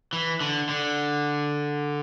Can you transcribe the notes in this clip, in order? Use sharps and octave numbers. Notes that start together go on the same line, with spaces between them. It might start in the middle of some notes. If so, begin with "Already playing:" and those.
E3
D3
D3